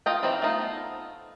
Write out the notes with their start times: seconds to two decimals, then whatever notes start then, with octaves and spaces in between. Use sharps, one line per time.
0.06 F4 D#5 G5
0.23 E3 F3 C4 D#4
0.42 A3 B3 D#4 F4